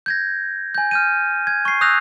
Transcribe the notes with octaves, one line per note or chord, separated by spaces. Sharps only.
G6 G#6 A#6
G#5 G6
F6 G6 D#7
G#6
C#6 C7
D#6 E6 F#6 G6 A#6 F7